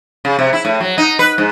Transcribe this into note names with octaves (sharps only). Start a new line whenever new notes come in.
C#3
C3
E4
A2
F#3
D#4
B4
G#2